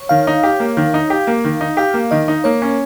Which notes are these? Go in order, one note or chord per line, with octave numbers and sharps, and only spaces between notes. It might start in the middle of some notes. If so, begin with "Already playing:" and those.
Already playing: C#5
D#3 F5
D#4
G4
A#3
D#3
D#4
G4
A#3
D#3
D#4
G4 F5
A#3
D#3 D#5
D#4
A#3 C#5
C#4